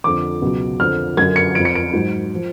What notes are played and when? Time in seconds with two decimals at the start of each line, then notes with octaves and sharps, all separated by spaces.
0.04 F2 D3 F3 D6
0.42 C#2 B2 F#3
0.80 F2 D3 F3 F6
1.17 F#2 D3 F#3 G#6
1.36 C#7
1.55 F2 F3 D7
1.65 C#7
1.75 D7
1.93 G#2 F#3
2.35 F3